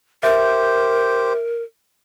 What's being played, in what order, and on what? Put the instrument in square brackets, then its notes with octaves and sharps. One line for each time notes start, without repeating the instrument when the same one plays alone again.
[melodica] G4 C5 [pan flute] A#4 [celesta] E5